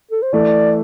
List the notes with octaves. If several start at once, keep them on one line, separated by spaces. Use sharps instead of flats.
A4
C5
E3 A3 D5